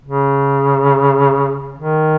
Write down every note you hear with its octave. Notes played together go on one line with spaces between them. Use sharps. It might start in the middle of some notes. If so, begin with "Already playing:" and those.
C#3
D#3